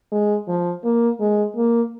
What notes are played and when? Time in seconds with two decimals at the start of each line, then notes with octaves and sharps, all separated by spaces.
0.12 G#3
0.48 F3
0.84 A#3
1.20 G#3
1.56 A#3